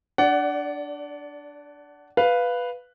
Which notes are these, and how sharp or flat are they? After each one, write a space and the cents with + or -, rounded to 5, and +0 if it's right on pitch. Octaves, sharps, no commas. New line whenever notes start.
D4 +0 D5 -25 F#5 +15
B4 +0 F5 +0